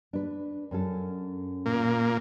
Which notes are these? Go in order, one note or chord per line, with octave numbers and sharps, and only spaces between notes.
D4 B4
F#2 C#4 A4
A#2 A#3